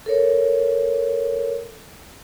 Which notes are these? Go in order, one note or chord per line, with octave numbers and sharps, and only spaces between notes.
A4 A#4 C#5